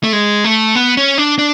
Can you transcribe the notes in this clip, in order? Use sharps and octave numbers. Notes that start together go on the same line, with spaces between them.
A3
G#3
A3
B3
C#4
D4
D4